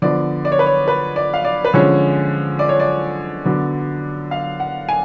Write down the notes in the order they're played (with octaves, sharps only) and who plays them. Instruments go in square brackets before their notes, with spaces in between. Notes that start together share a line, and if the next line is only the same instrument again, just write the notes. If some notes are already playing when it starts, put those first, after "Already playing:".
[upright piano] D3 F3 B3 D5
D5
C#5
B4
C#5
B4
D5
F5
D5
B4
D3 F3 G#3 C#4 C#5
D5
C#5
D5
D3 F#3 B3
F5
F#5
G#5